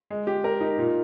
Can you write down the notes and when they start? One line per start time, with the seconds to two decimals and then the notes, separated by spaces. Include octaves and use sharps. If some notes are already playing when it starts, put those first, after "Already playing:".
0.10 G#3
0.27 G4
0.44 A#4
0.61 D#4
0.78 A#2